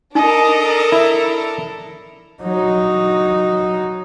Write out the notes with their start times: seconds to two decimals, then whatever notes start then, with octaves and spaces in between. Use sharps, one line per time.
0.15 D4 D#4 A4 A#4 D#5
0.92 E4 E5
2.42 F#3 D#4